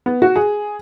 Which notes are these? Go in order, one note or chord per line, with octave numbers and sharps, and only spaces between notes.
B3
F#4
G#4